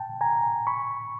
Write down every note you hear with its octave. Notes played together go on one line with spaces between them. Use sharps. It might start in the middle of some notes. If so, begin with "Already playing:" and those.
Already playing: G5 A5
G#5 A#5
B5 C#6